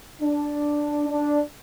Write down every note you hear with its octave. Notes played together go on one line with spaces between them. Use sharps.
D4
D4